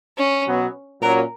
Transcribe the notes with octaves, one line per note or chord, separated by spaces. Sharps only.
C#4
B2 F#3 B3
A#2 F#3 A#3 C#4 F#4 A#4